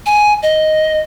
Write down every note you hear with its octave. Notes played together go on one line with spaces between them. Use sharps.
G#5
D#5